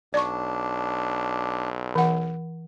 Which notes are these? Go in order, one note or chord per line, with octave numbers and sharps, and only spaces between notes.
B1 D4 D5 C#6
E3 F#5